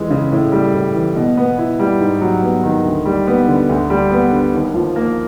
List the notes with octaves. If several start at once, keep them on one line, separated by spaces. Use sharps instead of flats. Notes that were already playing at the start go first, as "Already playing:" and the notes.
Already playing: F2 E3 G#3
C#3
A2
G3
A2
E3
B2
B3
E4
G3
G#2
F#3
B3
D#3
D2
G3
B3
D3
D2
G3
B3
D3
D#2
F3
A#3